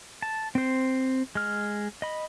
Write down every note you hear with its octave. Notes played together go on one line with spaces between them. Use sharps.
A5
C4 C5
G#3 F6
D#5 B5